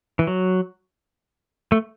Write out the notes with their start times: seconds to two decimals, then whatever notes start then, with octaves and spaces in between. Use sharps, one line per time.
0.19 E3
0.27 F#3
1.72 A3